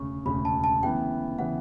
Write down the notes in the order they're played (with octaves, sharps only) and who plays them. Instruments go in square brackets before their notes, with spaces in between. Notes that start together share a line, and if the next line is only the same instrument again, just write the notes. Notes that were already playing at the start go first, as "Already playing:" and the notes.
Already playing: [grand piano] E1 D2 C#3 [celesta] C#6
[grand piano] E1 D2 C#3 [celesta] B5
[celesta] A5
A5
[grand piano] D2 C#3 E3 B3 E4 [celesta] G5
[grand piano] C#3 E3 B3 E4 [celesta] F#5